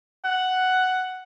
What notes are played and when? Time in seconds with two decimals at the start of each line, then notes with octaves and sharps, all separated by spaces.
0.25 F#5